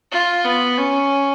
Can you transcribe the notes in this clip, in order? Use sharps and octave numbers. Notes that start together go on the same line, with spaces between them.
F4
B3
C#4